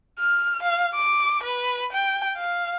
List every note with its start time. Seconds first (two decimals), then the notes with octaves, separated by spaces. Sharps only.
0.19 F6
0.63 F5
0.94 D6
1.43 B4
1.92 G5
2.37 F5